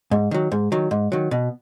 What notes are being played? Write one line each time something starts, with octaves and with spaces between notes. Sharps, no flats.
G#2
D#3 F#3
G#2
D#3 F#3
G#2
D#3 F#3
B2